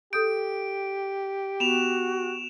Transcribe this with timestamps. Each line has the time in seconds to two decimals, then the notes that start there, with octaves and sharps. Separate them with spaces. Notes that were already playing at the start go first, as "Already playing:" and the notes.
0.13 G4 A4 D#6 G6 D7
1.60 B3 F#4 E7 F7